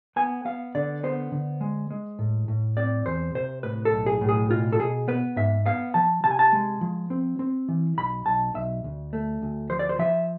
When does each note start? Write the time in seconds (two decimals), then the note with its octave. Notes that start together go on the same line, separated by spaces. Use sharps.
0.16 B3 G#5
0.45 B3 F5
0.75 D3 D5
1.03 B3 C5
1.32 D3
1.61 G#3
1.90 G#3
2.19 A2
2.48 A2
2.77 C4 D5
3.06 E2 C5
3.35 C3 C5
3.63 A2 B4
3.85 A4
3.92 B1
4.06 G#4
4.21 A2
4.29 G#4
4.50 B2 F4
4.72 A4
4.80 B2 G#4
5.08 B3 B4
5.36 G#2 E5
5.66 B3 F5
5.94 F3 A5
6.24 C3 A5
6.31 G#5
6.39 A5
6.53 G#3
6.81 F3
7.10 C4
7.39 C4
7.68 E3
7.97 B1 B5
8.26 B1 A5
8.54 B1 E5
8.84 D2
9.13 A3
9.42 D2
9.70 F3 C5
9.79 D5
9.89 C5
9.99 F3 E5